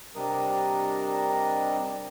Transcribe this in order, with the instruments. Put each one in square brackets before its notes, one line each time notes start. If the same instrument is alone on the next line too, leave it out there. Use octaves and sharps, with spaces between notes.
[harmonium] C3 G3 D4 A#4 D#5